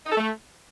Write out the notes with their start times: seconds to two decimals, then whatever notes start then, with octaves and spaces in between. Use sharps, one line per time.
0.06 D#4
0.12 A4
0.17 A3